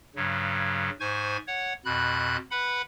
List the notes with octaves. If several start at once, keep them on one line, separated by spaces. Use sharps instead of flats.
G2 C#3 F#3
G#2 C5 G#5 C#6 G#6
C#5 F#5
F2 B2 B5 F#6
B4 F#5 B5